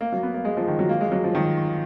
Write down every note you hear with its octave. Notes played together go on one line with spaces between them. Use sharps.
A#3
F#3
B3
A#3
G#3
F3
D#3
F#3
A#3
G#3
F#3
F3
D#3